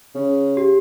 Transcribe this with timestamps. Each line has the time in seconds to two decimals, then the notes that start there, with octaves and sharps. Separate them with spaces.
0.15 C#3
0.57 G4